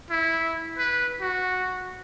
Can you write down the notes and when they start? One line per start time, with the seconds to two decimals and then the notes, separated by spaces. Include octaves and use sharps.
0.10 E4
0.78 B4
1.21 F#4